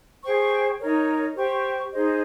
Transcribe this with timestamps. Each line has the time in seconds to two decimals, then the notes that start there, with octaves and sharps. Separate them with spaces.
0.23 G#4 C5 G5 C#6
0.79 D#4 A#4 C#5
1.36 G4 C5 G5 C#6
1.92 D#4 G#4 C5 D#5